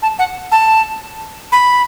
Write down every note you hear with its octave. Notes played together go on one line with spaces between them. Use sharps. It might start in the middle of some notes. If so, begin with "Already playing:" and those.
A5
F#5
A5
B5